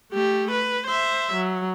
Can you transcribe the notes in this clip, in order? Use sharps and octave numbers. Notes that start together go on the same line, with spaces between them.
A3 G4
B4
C5 E5
F#3